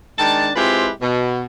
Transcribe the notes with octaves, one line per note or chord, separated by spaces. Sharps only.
D#3 G#3 D4 A5
G#3 C4 E4 F4 G4 B4
B2